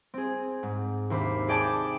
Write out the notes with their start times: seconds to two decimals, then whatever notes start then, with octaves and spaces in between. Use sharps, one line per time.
0.14 C4 G#4
0.63 G#2
1.10 D#2 C3 C4 D4 B5 C7
1.48 D#4 G#4 D5 G5 A5 D6